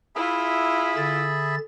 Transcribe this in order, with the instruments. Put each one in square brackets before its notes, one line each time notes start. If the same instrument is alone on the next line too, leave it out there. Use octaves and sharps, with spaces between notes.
[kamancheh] E4 F4 [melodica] G#4 E5 B5
[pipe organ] D3 A6